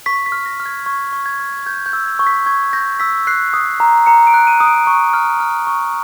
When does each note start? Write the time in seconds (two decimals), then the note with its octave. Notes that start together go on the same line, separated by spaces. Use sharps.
0.06 C#6 B6
0.26 B6
0.32 F6
0.46 A#6
0.60 F6
0.66 G#6
0.86 C#6 G#6
1.13 C#6
1.26 G#6
1.40 F6
1.66 G6 G#6
1.86 G6
1.93 E6
2.06 G#6
2.19 C#6
2.27 B6
2.46 C#6 G#6
2.73 G6 A#6
3.00 E6 B6
3.27 F#6 C7
3.53 D#6
3.80 A#5
4.06 A#5 C#7
4.27 D7
4.34 F#6
4.47 D#7
4.60 D#6
4.67 D7
4.87 C#6
5.14 F6
5.40 F6
5.67 C#6